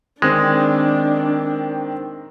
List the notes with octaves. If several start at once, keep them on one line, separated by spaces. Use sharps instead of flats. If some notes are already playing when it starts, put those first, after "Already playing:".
D#3 G#3 C4 D4